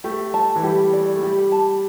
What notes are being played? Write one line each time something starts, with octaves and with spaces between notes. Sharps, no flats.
A3 G4
A5
E3
G3 G4
D5
A3
G3 G4
A5